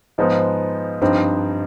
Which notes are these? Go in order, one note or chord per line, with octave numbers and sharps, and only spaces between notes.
G#2 F3 G#3 B3 D#4
G2 F3 C4 D#4